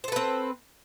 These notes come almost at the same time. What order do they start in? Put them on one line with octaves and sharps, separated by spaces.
C5 A4 B4 C4